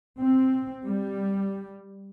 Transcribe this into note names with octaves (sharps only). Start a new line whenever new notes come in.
C4
G3